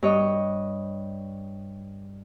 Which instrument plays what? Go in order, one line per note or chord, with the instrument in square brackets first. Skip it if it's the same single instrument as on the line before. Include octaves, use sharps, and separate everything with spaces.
[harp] G2 C#5 D#5